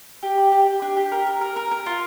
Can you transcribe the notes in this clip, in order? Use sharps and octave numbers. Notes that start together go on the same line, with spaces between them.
G4
D5
G4
G4
D4
G4
A#4
A#4
A#4
A#4
A#4
F4